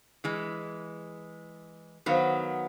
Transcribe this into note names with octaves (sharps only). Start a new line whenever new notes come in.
E3 G#3
D#3 F#3 B3 C5 F5 F#5